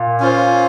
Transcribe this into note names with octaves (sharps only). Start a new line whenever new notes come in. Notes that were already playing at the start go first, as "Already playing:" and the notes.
Already playing: A#2
C#4 F4 C5